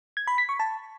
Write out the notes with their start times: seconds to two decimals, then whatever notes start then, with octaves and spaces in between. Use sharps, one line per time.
0.17 G#6
0.27 B5
0.38 B6
0.49 C#6
0.60 A5